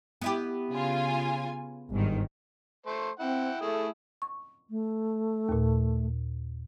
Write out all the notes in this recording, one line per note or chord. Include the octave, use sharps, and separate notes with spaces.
B3 E4 G4
C#3 F4 G#5
G1 G#2 D#3
A3 C5
C4 E4 F#5 G5
A3 E4 G#4
C#6
A3
D#2 A#2